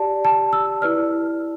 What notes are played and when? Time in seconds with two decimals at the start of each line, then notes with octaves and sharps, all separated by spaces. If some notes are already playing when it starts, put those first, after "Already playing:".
Already playing: G4 D5 A5
0.25 A5
0.53 E6
0.82 E4 B4 D5 F6